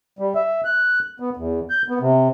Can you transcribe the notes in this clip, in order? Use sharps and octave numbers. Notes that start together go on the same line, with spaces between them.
G3
E5
F#6
B3
E2
G6
B3
C3